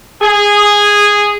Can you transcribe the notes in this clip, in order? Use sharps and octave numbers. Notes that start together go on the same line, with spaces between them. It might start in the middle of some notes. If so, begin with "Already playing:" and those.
G#4